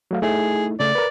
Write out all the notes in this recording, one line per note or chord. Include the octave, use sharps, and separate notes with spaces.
F#3 A3 F5
A3 D#4 E4 G#4
C#3 A3 D5
A#4 B4